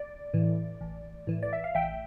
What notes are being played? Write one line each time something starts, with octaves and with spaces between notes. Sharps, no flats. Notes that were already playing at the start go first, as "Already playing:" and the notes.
Already playing: D5
A2 E3
A1
A2 E3
D5
E5
F5
A1 E5 G5